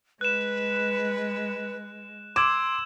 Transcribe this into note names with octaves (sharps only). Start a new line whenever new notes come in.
G#3 B4 F#6 E7
C6 D6 E6 G#6 E7